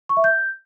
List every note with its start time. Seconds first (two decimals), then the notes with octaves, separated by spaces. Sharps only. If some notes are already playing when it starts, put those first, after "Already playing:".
0.09 C#6
0.17 E5
0.24 G6